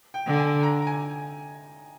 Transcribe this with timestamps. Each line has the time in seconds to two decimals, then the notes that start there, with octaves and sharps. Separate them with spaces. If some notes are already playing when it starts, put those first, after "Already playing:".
0.14 G5
0.26 D3
0.38 G#5
0.63 A#5
0.82 A#5
0.87 G#5